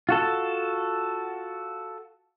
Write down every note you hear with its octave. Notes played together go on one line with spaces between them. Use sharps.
F4 F#4 A4